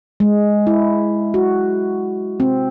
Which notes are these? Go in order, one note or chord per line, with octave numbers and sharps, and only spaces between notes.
G#3
E4
F#4
C4